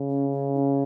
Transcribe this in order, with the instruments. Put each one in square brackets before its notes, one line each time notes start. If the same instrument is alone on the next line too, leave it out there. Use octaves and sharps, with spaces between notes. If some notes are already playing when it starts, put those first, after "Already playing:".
Already playing: [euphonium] C#3
[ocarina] C#4
C#4
D#4
C#4